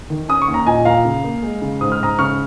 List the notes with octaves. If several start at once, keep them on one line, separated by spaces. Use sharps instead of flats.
D#3
C#4 D#6
C#6
D#2
A#5
A#2 D#5 G#5
A#2 F5 A#5
C#3
A#3
G#3
C#3
G#2 D#6
F6
G#2 A#5 D#6
C#3 C#6 F6